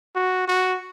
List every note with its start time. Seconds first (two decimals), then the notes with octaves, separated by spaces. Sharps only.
0.16 F#4
0.48 F#4